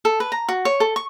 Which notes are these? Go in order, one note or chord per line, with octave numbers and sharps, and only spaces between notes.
A4
B4
A#5
F#4
C#5
A4
C#6